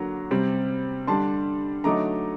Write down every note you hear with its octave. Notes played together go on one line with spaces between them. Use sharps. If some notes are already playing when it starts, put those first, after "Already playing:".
Already playing: D3 F#3 A#3 A#5
C3 G3 C4
D3 G3 D4 A5 C6
D3 F#3 A3 D#4 A#5 D6